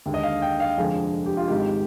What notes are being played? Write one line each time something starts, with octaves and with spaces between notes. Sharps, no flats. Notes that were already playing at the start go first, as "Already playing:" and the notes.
D#2 D3 G#3
D#5
F5
G5
F5
F1 F2 D3 F3 G#3 G#4
G4
F4
G#1 G#2 D#3 G#3 G4